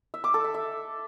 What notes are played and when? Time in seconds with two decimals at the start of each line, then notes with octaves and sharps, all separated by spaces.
0.14 E5
0.24 D6
0.34 A4
0.44 E5
0.54 E5